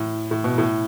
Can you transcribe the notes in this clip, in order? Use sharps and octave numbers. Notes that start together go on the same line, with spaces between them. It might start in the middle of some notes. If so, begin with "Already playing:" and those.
Already playing: A2
A2
B2
A2